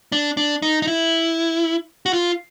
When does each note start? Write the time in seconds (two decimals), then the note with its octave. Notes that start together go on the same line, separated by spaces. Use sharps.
0.12 D4
0.37 D4
0.62 D#4
0.82 D#4
0.87 E4
2.06 F#4
2.13 F4